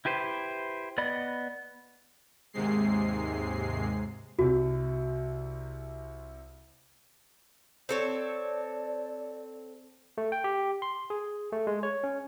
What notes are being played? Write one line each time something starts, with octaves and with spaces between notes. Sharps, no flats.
E4 G4 B4 C5
B3 D5 D#5 B5
D#2 G#2 C3 G#3 C7
C2 C3 F#4
C4 A4 C#5 D5
A3
G5
G4
C6
G#4
A3
G#3
C#5
C#4